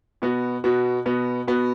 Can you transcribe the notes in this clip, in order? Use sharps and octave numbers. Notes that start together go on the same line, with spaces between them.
B2 B3 F#4
B2 B3 F#4
B2 B3 F#4
B2 B3 F#4